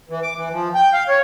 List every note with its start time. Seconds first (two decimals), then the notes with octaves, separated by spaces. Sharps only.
0.10 E3
0.23 D6
0.36 E3
0.51 F3
0.75 G5
0.93 F5
1.09 C#5